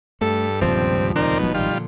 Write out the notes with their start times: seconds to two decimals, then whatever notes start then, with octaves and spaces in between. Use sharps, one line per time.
0.21 G2 A3 A4
0.61 D#1 C#2 C3 F3 C4
1.16 C4 D#4 A#4 D5
1.39 E1 B2 F#3 G#3
1.54 G#1 A#2 D#3 G3 F4
1.71 A#2 D3